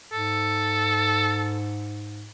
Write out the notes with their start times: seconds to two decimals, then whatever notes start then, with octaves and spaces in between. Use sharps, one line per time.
0.12 G#2 A4